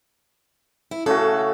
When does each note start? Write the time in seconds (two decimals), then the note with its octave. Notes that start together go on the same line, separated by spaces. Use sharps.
0.91 E4
1.06 C#3 A3 F#4 A4